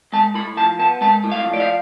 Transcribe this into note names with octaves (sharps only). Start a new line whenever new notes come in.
G#3 A5
A2 B5
F3 A5
B3 A5
G#3 A5
A2
F5
F3
D5
F5